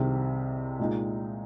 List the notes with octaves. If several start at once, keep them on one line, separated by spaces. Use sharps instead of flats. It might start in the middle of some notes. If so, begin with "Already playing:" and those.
Already playing: C2 C3 D#3 C4 G#4
A#2 G#3 D#4